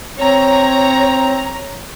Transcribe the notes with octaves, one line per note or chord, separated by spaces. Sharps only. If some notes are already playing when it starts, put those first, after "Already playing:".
C4 C#5 A#5